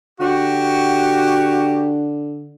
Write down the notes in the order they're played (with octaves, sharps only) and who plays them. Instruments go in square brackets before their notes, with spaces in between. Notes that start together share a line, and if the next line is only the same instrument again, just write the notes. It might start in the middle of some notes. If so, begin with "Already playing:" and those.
[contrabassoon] D3 [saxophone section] F#4 [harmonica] G4